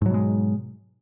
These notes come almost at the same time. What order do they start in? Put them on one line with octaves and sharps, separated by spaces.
G#2 F#3 B2 G#3